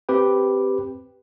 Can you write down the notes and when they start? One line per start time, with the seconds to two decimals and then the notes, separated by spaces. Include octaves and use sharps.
0.09 C4 G4 B4 G5